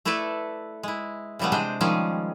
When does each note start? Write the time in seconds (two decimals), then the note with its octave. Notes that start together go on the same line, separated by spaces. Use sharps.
0.05 A3 E4 A4 B4 D5
0.83 G#3 E4
1.39 C#3 E3 G3 A3 B3
1.52 C3 G#3 D4 C5 G5
1.81 D#3 F3 G3 G#3 C#4 G#4